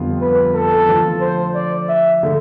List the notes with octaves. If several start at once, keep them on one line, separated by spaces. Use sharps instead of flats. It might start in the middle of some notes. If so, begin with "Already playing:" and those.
Already playing: F2 D3 G3 B3 F4
B4
A4
D3 F3 A3 D4 F4
C5
D5
E5
D3 A3